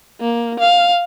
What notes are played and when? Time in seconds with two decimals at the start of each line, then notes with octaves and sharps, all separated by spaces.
0.20 A#3
0.60 F5